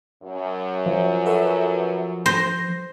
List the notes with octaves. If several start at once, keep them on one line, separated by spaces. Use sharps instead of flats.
F#2
F3
A4 B4 E5
C5 A#6